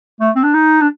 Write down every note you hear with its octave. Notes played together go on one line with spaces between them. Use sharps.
A3
C4
D4
D#4
D4